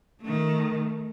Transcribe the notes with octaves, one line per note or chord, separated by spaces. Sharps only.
D#3 A3